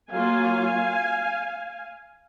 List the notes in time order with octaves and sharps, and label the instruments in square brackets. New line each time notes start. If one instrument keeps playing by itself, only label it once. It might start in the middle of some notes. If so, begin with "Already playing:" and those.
[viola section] F#3 A#3 F4 F5 G#5